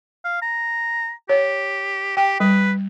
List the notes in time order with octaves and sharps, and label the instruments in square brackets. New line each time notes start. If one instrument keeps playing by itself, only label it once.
[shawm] F5
A#5
[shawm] G4 [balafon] C#5
[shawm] G4 [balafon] G5
[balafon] G3 [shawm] B4